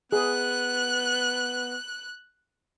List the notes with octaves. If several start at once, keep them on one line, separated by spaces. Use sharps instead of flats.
B3 G#4 F#6